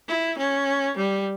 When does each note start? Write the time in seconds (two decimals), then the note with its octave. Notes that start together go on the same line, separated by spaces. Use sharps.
0.08 E4
0.38 C#4
0.97 G3